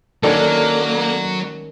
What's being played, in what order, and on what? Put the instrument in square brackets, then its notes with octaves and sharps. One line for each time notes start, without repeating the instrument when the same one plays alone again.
[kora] D#3 C#4 D4 [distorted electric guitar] F#3 [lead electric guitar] A#3 [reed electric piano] A4 D5